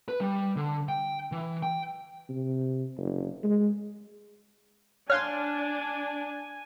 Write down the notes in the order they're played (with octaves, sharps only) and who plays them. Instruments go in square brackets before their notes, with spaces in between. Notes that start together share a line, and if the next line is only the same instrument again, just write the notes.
[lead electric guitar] B4
G3
D3
G5
E3
G5
[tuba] C3
F#1
G#3
[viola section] D4 [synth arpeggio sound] C#5 F5 C6 [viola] G#5 [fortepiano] F6 F#6